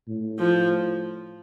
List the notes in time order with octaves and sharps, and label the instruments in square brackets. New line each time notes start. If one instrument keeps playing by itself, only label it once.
[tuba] A2
[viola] F3